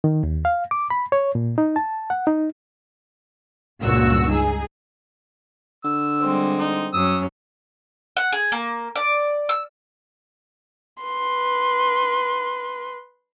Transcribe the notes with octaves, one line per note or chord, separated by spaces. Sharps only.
D#3
D#2
F5
D6
B5
C#5
A#2
D#4
A5
F#5
D#4
C#2 G2 A#2 F#4 E6
D#4 G#4
D3 E6
G3 G#3 C4
D#4
F#2 F#3 C#4 D#6 E6
F#5
G#4
A#3
D5
E6
B4 C6